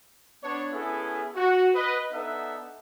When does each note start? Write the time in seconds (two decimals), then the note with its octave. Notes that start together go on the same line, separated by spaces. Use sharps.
0.43 B3 D4 C#5
0.73 B3 C#4 E4 G#4 A4
1.36 F#4
1.75 B4 D#5
2.12 B3 D4 D#4 A4 E5 F#5